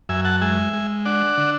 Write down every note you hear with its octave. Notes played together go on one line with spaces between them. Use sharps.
F#2 E5 G#5
F#5 A5
G#3 E5 G#5
G#3
D4 D5 F#5
D3